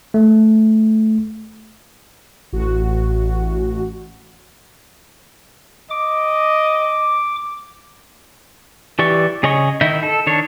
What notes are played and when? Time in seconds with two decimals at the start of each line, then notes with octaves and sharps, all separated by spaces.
0.14 A3
2.53 A1 F#4
5.90 D#5 D6
8.99 E3 G4 D5 C#6
9.43 C#3 G#4 C#5 D#5 C#6
9.81 D#3 E4 D#5 E5 G6
10.03 A4
10.27 D#3 D4 C#5